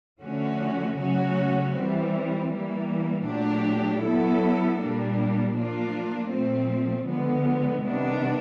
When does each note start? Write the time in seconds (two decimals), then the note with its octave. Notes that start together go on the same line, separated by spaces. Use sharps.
0.22 D3 F3 A3 C#4 F#4
0.98 C#3 F#3 A3 C#4 F#4
1.75 E3 G3 C4
2.51 E3 G3 A#3
3.27 A#2 F#3 A3 D4 G4
4.03 F#3 B3 E4 A4
4.79 A#2 G3 A#3 D4
5.55 F3 A#3 D4 F4
6.31 A#2 F3 A3 C4
7.07 D3 F3 G#3 B3
7.83 C3 D#3 G3 B3 D4